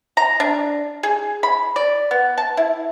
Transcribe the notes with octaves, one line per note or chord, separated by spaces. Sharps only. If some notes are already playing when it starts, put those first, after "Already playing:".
A#5
D4
G#4
B5
D5
B3
A5
E4